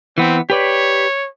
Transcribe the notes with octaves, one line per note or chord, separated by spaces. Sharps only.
E3 B3 C4
G4 B4 C#5 D5